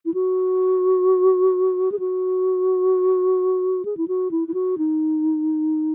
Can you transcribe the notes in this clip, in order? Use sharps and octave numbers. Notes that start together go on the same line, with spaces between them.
E4
F#4
G#4
F#4
G#4
E4
F#4
E4
E4
F#4
D#4